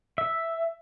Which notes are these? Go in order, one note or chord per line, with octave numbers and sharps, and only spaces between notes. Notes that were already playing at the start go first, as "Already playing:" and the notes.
E5